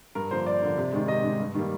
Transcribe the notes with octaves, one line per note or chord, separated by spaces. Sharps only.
G2 A#4
D3 F3 A#3 C5
G2 D5
D3 F3 A#3
C3
D#3 G#3
C3 D#5
D#3 G#3
G2
D#3 G3 A#3